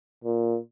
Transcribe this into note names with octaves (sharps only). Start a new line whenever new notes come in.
A#2